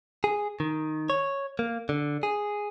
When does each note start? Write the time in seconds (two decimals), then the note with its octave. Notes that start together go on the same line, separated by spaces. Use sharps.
0.24 G#4
0.60 D#3
1.10 C#5
1.59 A#3
1.89 D3
2.23 G#4